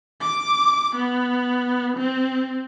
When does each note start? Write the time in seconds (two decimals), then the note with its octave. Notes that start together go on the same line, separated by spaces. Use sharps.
0.21 D6
0.96 B3
1.97 C4